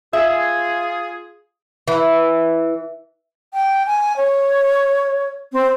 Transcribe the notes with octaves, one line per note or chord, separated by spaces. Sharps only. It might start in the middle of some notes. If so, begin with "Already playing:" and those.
F4 G#4 E5
E3
G5
G#5
C#5
C4